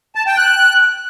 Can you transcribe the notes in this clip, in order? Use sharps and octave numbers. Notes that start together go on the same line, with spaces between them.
A5
G5
F#6